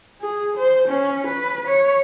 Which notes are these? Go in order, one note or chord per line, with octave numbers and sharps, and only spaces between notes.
G#4
C5
C#4
B4
C#5